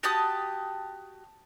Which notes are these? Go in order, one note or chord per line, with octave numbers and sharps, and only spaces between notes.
F#4 G4 A5 D#6